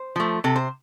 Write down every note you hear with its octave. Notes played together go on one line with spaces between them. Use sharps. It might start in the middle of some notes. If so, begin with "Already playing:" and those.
Already playing: C5
F3 A3
C3 A4
C5